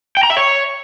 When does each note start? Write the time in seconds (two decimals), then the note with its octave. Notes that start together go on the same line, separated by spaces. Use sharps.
0.17 G5
0.23 A#5
0.30 E5
0.37 C#5